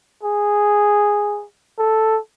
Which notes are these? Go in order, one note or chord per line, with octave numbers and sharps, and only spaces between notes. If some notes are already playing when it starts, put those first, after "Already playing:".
G#4
A4